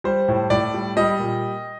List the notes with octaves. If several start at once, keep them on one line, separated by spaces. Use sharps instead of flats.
G3 C5
A2
A2 D5
G3
G3 D#5
A#2